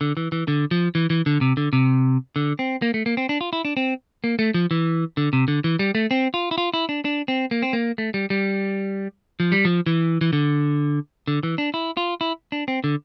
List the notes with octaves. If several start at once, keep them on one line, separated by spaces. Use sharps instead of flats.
D3
E3
E3
D3
F3
E3
E3
D3
C3
D3
C3
D3
C4
A#3
A3
A#3
C4
D4
F4
E4
D4
C4
A#3
A3
F3
E3
D3
C3
D3
E3
G3
A3
C4
F4
E4
F4
E4
D4
D4
C4
A#3
C4
A#3
A3
G3
G3
F3
G3
F3
E3
E3
D3
D3
E3
D4
E4
F4
E4
D4
C4
D3